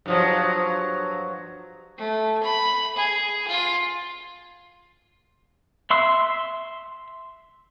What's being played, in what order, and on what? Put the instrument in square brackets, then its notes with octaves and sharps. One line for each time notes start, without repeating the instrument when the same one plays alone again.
[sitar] G2 F3 F#3
[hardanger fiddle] A3
B5
G#4
F4
[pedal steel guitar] E5 C6 E6